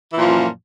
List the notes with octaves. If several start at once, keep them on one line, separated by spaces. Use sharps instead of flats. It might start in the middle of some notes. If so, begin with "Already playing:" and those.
F#2 A#2 E3 F3